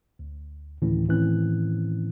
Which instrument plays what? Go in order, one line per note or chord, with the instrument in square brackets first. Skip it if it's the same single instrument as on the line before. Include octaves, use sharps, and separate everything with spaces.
[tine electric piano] D2
D2 A2 D#3 E3 C#4
A2 D#3 E3 C4 C#4 F#6